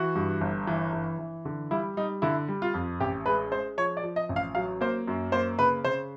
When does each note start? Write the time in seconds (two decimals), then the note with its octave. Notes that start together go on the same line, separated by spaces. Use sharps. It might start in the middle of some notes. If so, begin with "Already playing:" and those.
Already playing: E3 F#4
0.15 G2
0.41 G1
0.67 E3
0.93 E3
1.18 E3
1.45 D3
1.71 G3 E4
1.97 G3 D#4
2.22 D3 E4
2.48 G3
2.62 F4
2.74 F2
3.01 A1 G4
3.26 G#3 B4
3.51 G#3 C5
3.77 F3 C#5
3.97 D5
4.03 F3
4.16 D#5
4.29 A1
4.36 F5
4.55 F#3 F5
4.81 A#3 C5
5.08 F#2
5.32 A#3 C5
5.59 C#3 B4
5.85 C#3 C5